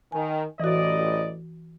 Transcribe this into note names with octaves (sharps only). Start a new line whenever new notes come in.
D#3 G#5
A1 E3 F#4 D5 D#5